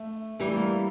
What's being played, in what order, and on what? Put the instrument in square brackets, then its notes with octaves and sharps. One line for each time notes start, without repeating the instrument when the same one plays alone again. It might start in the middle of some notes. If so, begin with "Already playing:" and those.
Already playing: [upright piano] A3
[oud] E3 G3 [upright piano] A3
[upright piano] A#3